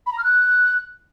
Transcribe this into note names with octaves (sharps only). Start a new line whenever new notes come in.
B5
A#5
F6
F#6